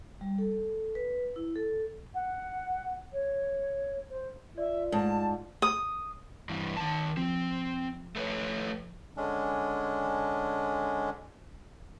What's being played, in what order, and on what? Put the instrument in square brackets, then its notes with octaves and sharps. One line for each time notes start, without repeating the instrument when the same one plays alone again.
[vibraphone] G3
A4
B4
E4
A4
[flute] F#5
C#5
C5
[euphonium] F4 [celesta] D5 [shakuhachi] E5
[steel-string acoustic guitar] G#2 [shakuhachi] A5
[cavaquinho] D#6
[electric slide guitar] G2 E3
D#3 A5
[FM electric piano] F3 [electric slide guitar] C4
[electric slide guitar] A3 B4 C#5
[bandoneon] D3 G#3 C#4 D4